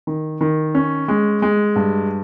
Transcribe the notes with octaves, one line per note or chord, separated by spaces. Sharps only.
D#3
D#3
C#4
G#3
G#3
G2